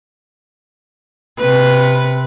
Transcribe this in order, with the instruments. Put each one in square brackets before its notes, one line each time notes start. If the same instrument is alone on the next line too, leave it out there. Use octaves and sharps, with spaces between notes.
[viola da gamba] C3 B4